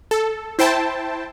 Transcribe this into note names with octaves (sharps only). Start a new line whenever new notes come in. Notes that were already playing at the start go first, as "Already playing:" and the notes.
A4
E4 C5 G5 A5